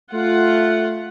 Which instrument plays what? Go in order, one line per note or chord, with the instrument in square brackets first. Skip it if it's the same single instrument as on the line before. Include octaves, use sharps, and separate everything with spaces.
[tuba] A3 [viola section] F4 F#5